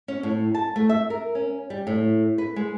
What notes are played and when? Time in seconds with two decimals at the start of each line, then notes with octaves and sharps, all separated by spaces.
0.08 C#4
0.23 A2
0.55 A5
0.76 A3
0.89 E5
1.10 A#4
1.35 C#4
1.70 G3
1.87 A2
2.38 B4
2.56 G#3